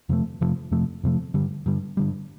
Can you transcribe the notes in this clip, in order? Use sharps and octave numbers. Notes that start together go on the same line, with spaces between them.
F2 C3 F3 A3
F2 C3 F3 A3
F2 C3 F3 A3
F2 C3 F3 A3
G2 D3 G3
G2 D3 G3
G2 D3 G3